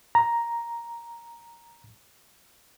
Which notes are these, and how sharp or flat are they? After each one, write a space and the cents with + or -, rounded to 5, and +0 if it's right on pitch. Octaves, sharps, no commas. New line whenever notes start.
A#5 +5